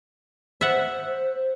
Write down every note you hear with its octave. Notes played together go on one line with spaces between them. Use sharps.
C5 E5 F#5